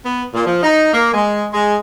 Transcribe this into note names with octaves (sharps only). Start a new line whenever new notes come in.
B3
A#2
F3
D#4
A#3
G#3
G#3